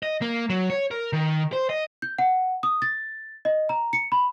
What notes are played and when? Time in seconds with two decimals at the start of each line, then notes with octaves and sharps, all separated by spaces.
0.03 D#5
0.22 A#3
0.50 F#3
0.70 C#5
0.91 A#4
1.13 D#3
1.53 C5
1.69 D#5
2.02 G6
2.19 F#5
2.63 D#6
2.82 A6
3.45 D#5
3.69 A#5
3.93 C#7
4.12 B5